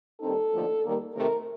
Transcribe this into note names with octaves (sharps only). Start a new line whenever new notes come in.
D#2 D#3 G3 C4 D#4 A4
D#2 D3 F3 A3 D4
D#2 D#3 G3 A#3
C3 D#3 A3 A#4